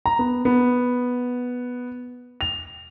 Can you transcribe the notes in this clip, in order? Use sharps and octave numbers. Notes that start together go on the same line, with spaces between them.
A#5
B3
B3
F7